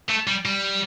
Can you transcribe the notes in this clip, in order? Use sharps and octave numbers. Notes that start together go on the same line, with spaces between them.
A3
G3
G3